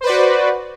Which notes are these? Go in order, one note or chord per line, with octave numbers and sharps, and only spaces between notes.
F#4 B4 C5 D5